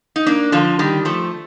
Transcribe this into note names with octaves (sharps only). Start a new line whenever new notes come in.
D#4
A#3 D4
D3 F3
D#3 G3
F3 A3